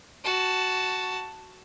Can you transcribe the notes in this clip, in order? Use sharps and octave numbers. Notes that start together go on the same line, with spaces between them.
F#4 A5